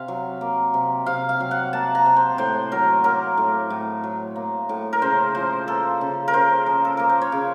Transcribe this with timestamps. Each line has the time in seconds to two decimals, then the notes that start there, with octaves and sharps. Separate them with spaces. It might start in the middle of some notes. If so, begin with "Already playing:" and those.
Already playing: C3 F5
0.08 F#3
0.41 A#3
0.74 C3
1.06 C3 F5
1.29 F5
1.40 F#3
1.51 F#5
1.73 A#3 A5
1.95 A#5
2.06 C3
2.16 C5
2.38 A2 C5
2.72 F#3 A#4
3.04 A#3 A#4
3.37 A2
3.70 A2
4.03 F#3
4.36 A#3
4.69 A2
4.93 A#4
5.02 C#3 C5
5.35 F3 C5
5.67 A#3 A4
6.01 C#3
6.28 A#4
6.33 C#3 C5
6.66 F3
6.85 A4
6.97 A#3 A#4
7.09 C5
7.22 C#5
7.32 C#3